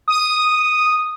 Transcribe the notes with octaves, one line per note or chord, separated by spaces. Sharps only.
D#6